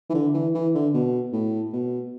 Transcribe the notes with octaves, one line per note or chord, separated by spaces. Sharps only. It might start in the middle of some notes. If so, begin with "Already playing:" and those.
E3
D3
E3
E3
D3
B2
A2
B2